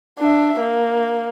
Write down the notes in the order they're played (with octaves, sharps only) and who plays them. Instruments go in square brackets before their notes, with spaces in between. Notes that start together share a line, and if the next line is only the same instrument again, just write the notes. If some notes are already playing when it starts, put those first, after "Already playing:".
[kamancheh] D4 E5
A#3